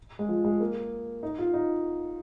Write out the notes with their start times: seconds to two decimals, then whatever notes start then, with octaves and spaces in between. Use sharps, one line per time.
0.19 G#3
0.29 F3
0.44 G#3
0.60 A#3
1.23 D#4
1.39 F4
1.54 D#4